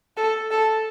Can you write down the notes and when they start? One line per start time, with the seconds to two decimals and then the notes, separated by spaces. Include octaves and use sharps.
0.17 A4
0.51 A4